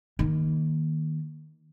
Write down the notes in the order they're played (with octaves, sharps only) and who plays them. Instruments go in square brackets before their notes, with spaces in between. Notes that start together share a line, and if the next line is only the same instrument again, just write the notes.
[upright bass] D#3 A#3